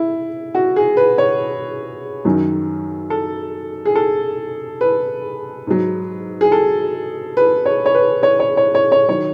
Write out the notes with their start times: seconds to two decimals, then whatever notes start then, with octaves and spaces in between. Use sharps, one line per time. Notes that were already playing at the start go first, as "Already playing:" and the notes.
Already playing: E4
0.55 F#4
0.76 G#4
0.97 B4
1.18 C#5
2.25 F#2 D#3 F#3
3.10 A4
3.85 G#4
3.95 A4
4.81 B4
5.67 G#2 F#3
6.41 G#4
6.52 A4
7.37 B4
7.66 C#5
7.86 C#5
7.95 B4
8.23 C#5
8.40 C#5
8.57 C#5
8.75 C#5
8.92 C#5
9.08 D#3 F#3 C#5